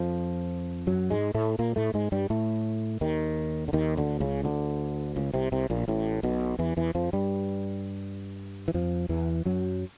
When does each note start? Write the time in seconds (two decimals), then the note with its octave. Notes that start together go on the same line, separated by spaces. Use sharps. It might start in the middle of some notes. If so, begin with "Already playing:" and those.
Already playing: F2 F3
0.87 F#2 F#3
1.10 G#2 G#3
1.34 A2 A3
1.59 A#2 A#3
1.76 A2 A3
1.94 G#2 G#3
2.12 G2 G3
2.30 A2 A3
3.01 D#2 D#3
3.68 D3
3.73 D#2 D#3
3.97 D2 D3
4.20 C#2 C#3
4.44 D2 D3
5.16 C#2 C#3
5.34 C2 C3
5.52 C2 C3
5.70 A#1 A#2
5.88 A1 A2
6.23 B1 B2
6.59 E2 E3
6.77 E2 E3
6.95 F2 F3
7.13 G2 G3
8.68 E3
8.74 F2 F3
9.09 E2 E3
9.45 F#2 F#3